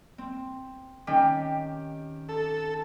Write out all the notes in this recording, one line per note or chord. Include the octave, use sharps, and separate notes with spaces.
C4
D#3 C#4 G4
A4